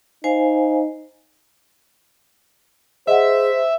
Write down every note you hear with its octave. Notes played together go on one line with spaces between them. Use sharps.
D#4 C5 F5 G#5
G#4 C5 D#5 E5 F#5